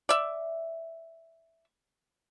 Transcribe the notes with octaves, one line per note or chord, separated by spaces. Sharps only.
D5 E5